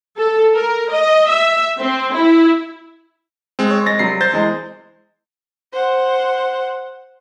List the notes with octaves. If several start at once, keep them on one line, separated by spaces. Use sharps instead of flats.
A4
A#4
D#5
E5
C4
E4
G#3 C4
C#5
G#3 A6 A#6
C3 F#3 G3 C7
C5 G6 A6
E2 G#3
C5 F#5